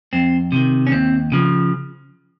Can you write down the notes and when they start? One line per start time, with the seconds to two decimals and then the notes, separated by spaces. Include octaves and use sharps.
0.13 F2 C4
0.52 C3 D#3
0.87 C#4
0.92 D#2 C4
1.32 C#3 F3